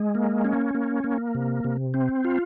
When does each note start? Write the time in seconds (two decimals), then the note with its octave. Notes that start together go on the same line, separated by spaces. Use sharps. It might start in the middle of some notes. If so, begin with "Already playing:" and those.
Already playing: G#3
0.15 A#3
0.45 C#4
0.75 A#3
1.04 A#3
1.35 C3
1.64 C3
1.94 C4
2.25 F4